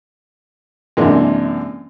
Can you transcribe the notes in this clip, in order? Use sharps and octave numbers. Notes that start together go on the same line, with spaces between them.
F#2 C3 E3 G#3 A#3 D4